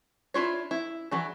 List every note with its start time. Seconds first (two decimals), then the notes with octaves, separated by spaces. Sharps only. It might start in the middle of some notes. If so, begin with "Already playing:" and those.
0.34 D4 E4 F4 C#5
0.71 E4
1.11 E3 F#3 D4